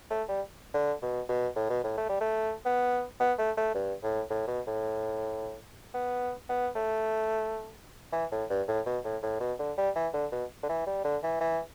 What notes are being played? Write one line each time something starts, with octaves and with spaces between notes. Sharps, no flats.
A3
G3
D3
B2
B2
A2
B2
A2
A3
G3
A3
B3
B3
A3
A3
G2
A2
A2
B2
A2
B3
B3
A3
E3
A2
G2
A2
B2
A2
A2
B2
D3
G3
E3
D3
B2
D3
E3
G3
D3
E3
E3